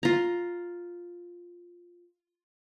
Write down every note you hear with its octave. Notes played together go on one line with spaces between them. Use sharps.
F4 A#5